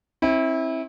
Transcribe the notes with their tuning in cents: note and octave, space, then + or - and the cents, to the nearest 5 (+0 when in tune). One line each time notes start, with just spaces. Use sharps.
C4 +35 E4 -20